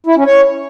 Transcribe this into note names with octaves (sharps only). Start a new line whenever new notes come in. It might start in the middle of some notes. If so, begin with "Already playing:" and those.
E4
C#4
C#5